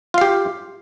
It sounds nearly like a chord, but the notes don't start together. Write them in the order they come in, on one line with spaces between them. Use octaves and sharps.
F4 F5 G4